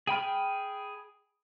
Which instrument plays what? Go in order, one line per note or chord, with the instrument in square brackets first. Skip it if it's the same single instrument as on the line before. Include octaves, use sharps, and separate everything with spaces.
[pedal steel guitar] G#4 G5 B5 F6